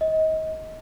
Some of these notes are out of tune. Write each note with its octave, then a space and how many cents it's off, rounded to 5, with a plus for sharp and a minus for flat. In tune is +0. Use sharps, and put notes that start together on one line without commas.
D#5 +25